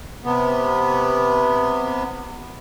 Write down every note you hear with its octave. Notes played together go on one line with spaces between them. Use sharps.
C3 B3